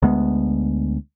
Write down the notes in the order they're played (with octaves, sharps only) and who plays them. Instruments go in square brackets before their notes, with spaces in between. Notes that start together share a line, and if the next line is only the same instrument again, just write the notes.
[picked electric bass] D2 G#3 B3